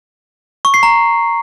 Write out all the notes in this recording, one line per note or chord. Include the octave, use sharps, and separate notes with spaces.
C#6
C7
A#5